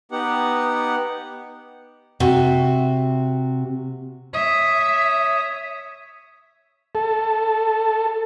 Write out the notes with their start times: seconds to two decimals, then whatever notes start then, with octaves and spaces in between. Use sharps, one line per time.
0.12 B3 D#4 G4 F#5
2.20 C3 F#4
4.34 C#5 E5 D#6
6.95 A4